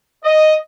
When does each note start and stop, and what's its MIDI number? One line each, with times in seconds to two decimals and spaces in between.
0.24 0.53 75